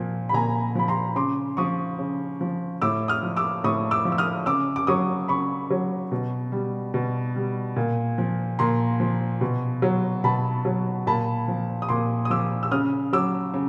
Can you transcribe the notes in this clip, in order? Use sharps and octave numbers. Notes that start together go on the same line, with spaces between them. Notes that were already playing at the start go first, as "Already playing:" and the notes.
Already playing: A#2 F3
B5
A#2 G#5 A#5
F3 B5
A#5 C6
C#3 C6 D6
F3 C#6 D#6
C#3
F3
A2 D6 E6
D#6 F6
F3
D6 E6
A2 C#6 D#6
D6 E6
F3
E6
D#6 F6
C#3 D6 E6
D6
F#3 C#6 D#6
C#3 B5 C#6
F#3
B2
G3
B2
G3
A#2
F3
A#2 A#5 C6
F3
B2
F#3
B2 A5 B5
F#3
A#2 A5 B5
F3
D#6
A#2 C6 D6
D#6
F3 D6 E6
E6
C#3 D#6 F6
F#3 D6 E6
C#3